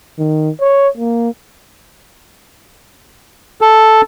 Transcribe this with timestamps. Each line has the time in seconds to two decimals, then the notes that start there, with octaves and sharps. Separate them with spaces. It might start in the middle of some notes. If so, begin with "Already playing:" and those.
0.19 D#3
0.60 C#5
0.97 A#3
3.61 A4